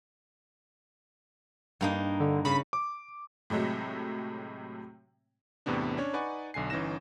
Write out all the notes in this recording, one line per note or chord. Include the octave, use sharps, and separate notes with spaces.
G2 A#3 D#4
D3
C#3 B5
D6
A2 C3 F#3 G#3 A3
E2 A2 C3 B3 D4
C#4 D4 C#5
D#4 B4 D5 F#5 G#5 C#6
B1 D3 G#5 C7
G1 E3 C#4 D#4 A#6 E7